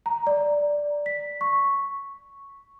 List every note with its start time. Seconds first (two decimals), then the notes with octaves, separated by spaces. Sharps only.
0.06 A#5
0.27 D5
1.06 B6
1.41 C#6